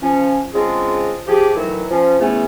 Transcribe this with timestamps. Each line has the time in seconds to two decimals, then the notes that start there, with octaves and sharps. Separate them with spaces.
0.02 F3 C#4
0.53 C#3 G#3 C4 D4 F4 G#4
1.27 F3 G4 G#4
1.55 D2 D#3 E3 F#3
1.90 F3 C#4
2.20 E2 C#3 E3 A3 B3 C#4